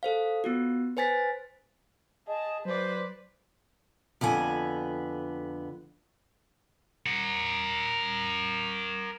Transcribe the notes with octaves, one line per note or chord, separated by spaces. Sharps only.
A4 C5 F5
B3 F4 F#4
B4 C5 G#5 A6 B6
G#4 D#5 A5
F#3 B4 C5 D5
F2 D3 B3 G#5
A#4 F#5